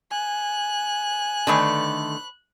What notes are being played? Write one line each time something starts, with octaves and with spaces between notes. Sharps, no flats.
G#5 F#6
D3 D#3 A3 B4 C#5 A5